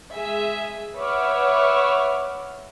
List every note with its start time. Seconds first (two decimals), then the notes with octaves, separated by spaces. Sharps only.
0.13 G#3 G#4 E5
0.97 B4 C#5 E5 F#5 D6 F6